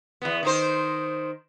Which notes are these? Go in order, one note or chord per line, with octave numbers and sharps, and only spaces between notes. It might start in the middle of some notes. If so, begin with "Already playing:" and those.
E2 B3
D#3 D#4 C5